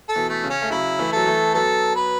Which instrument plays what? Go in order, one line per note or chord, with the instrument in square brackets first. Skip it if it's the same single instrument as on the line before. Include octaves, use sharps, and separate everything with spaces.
[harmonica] A4
[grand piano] B2 E3
[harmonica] A3
[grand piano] C#3
[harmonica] C#4
[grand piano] A3
[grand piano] C#3 F#3 [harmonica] E4
[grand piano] E3 A3
[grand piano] F#3 [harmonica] A4
[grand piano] E3 A3
[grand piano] F#3 B3 [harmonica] A4
[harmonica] B4